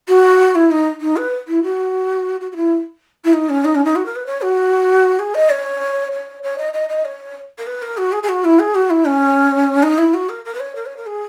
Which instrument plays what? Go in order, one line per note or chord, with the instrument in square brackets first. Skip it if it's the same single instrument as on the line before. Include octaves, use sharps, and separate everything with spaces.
[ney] F#4
E4
D#4
D#4
B4
E4
F#4
F#4
F#4
E4
E4
D#4
C#4
D#4
C#4
D#4
F#4
A#4
B4
C#5
F#4
G#4
D#5
C#5
C#5
C#5
D#5
D#5
D#5
C#5
A#4
B4
A#4
F#4
G#4
G#4
F#4
E4
G#4
F#4
E4
C#4
D#4
E4
F#4
A#4
A#4
B4
C#5
A#4
C#5
A#4
G#4